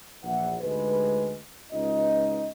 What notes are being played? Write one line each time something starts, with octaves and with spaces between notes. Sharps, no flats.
A#1 E3 F#5
D2 G#2 G#3 G4 B4
C#2 C#4 D#4 F4 B4 D#5